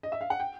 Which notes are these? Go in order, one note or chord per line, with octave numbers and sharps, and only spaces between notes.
D#5
E5
F5
F#5
G5